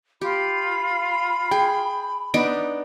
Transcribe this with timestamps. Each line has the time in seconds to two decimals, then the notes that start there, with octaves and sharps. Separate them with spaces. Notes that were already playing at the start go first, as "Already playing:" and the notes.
0.21 F4 G4 B5
1.51 G#4 G5
2.34 B3 D4 D#4 D7